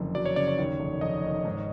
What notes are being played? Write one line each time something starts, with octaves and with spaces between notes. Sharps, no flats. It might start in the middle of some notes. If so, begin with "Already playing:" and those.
Already playing: F#1 F2 D3
F#3 D5
C#5
C#3 D5
C#5
D#2
F1
F1 D#5
D#3
G#2